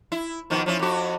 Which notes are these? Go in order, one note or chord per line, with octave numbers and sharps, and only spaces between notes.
E4
B2 D#3 F3
F3 C#4 E4
F2 F#4